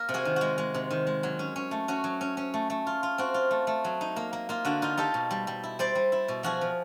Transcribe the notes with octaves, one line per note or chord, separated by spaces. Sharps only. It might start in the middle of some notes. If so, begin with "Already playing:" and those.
Already playing: A#3 A#4
C3
F#4 G#4
D#3
G#3 F#4
G#3
C3
D#3
G#3
F#3
C#4
C#4
A3
C#4 F#4
F#3
C#4
C#4
A3
A3
F4
F4
C4 F#4
F4
A3
A3
F#3
D#4
A#3
A#3
A#3 F4
D3 F#4
D#4 F4
D#4 G4 A4
B2
G3
G3
E4
G3 C5 D5
G3
E4
B2
F3 F#4 G#4
F3